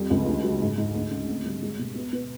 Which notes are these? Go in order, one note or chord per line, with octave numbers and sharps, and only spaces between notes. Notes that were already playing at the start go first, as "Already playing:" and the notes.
Already playing: F2 G3
C#2
D2
F#3
G#2
G#2
D2
C#3
C4
G3
G#3
B2
B3
B3